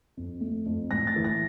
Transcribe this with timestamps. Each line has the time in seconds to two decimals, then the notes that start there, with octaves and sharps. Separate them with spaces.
0.17 F2
0.41 A3
0.66 F2
0.91 A2 A#6
1.07 A6
1.16 E3
1.24 A#6